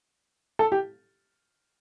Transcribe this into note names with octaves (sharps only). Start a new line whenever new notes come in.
A4
G4